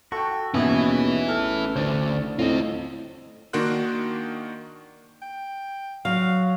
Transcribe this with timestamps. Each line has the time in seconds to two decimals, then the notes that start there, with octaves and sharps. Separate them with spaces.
0.12 F#4 A4 G5 C#6
0.54 D#2 B2 E3 C#4 E4 G#4 B4
1.28 A1 A4 F6
1.76 D2 D4 C5 D5
2.39 A2 C4 F4 D#5
3.53 D#3 A#3 D4 F#4 C6 F#6
5.22 G5
6.05 F#3 F5